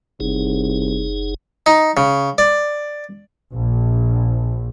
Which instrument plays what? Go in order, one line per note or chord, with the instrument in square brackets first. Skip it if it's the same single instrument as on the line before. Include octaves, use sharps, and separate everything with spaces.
[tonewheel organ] F#1 D#4 G#4 [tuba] C2
[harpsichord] D#4
C#3
D5
[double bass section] A#1